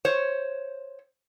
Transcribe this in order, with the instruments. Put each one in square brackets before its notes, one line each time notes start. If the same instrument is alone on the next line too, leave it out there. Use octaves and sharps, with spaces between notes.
[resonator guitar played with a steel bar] C5 C#5